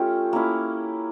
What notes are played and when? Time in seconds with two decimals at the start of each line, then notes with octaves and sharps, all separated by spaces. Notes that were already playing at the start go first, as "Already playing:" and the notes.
Already playing: A3 C#4 F4 G4
0.33 A#3 C#4 E4